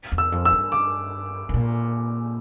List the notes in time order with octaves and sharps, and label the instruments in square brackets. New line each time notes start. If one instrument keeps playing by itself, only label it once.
[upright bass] E2
[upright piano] E6
[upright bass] F2
[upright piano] E6
[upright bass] G2
[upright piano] D6
[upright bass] C3
A#2